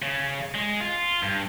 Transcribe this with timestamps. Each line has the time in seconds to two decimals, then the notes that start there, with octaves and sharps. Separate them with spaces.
0.02 C#3
0.55 G#3
0.81 F4
1.23 G2